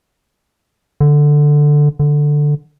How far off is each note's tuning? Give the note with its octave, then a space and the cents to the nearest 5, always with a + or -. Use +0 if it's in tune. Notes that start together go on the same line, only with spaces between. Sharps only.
D3 +5
D3 +5